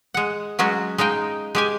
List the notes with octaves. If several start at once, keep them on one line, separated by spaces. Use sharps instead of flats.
G#3 F#5
F#3 G#3 C#4 F#4
G#3 D#4 F5 G5
G#3 G4 G#5